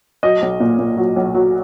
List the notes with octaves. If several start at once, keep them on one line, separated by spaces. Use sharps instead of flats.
F#3 D#5
B1
A#2
A#2
F#3
B1
F#3